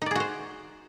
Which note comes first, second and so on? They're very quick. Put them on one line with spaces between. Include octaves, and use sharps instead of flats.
D#4 D5 G#4 F#4 C5